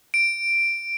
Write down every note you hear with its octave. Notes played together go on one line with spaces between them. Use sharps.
D7